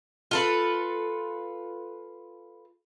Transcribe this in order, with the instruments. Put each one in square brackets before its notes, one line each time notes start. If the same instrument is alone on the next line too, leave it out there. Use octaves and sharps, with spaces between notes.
[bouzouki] F4 A4 B4